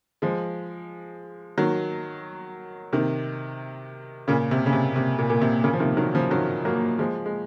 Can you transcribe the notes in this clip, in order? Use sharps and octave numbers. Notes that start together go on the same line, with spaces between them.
F3 G#3
D#3 F#3
C3 D#3
A#2 C#3
C3
C#3
C3
C3
A#2
A#2
C3
A#2 C#3
F3
C3 D#3
D#3 F#3
C#3 F3
D#3 F#3
F#3 A#3
F3 G#3
G#3